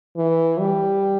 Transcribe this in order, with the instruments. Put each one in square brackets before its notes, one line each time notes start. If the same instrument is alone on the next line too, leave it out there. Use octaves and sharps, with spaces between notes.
[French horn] E3
G3